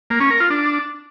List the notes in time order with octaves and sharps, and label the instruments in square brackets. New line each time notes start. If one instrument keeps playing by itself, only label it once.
[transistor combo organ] A#3
C#4
A#4
F4
D4